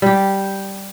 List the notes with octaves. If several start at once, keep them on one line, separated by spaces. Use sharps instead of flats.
G3 G4